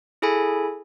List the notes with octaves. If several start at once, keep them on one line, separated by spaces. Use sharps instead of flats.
E4 G#4 A4 G#5 B5